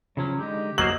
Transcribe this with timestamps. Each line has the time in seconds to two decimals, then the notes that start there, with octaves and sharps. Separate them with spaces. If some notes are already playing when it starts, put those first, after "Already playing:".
0.17 C#3 F3 F#3 C#4
0.39 D3 G#3 D#4 G4
0.78 F#3 A#3 A#4 C5 D#5 F#7